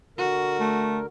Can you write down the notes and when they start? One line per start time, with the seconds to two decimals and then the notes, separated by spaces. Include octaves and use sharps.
0.18 D3 F#4 A#4
0.60 A3